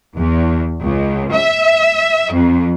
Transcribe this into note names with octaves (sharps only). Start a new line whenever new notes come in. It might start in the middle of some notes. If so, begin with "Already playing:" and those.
E2
C#2
E5
F2